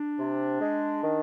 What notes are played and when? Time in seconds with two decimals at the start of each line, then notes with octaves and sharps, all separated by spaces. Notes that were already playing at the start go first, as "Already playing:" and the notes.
Already playing: D4
0.18 C3
0.60 G#3
1.03 D#3